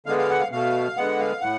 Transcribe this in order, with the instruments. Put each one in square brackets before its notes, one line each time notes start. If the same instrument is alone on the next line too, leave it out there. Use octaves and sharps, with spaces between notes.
[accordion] D3 G#3 B3 F5
F5
F#5
F5
B2 A3 F5
D3 G#3 B3 F#5
F5
A2 F#5